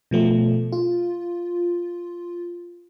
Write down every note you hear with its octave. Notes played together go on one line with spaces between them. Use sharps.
B2 F3 A3
F4